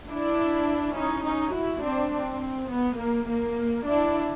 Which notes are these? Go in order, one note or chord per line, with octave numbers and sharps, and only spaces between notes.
D4 E4
C#4 D#4
C#4 D#4
E4 F#4
C4 D4
C4
B3
A#3
A#3
D4 E4